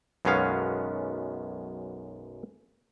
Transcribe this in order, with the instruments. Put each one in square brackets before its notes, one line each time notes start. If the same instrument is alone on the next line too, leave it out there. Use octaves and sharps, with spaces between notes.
[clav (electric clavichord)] B1 F#2 G#3 B3 C#4 F5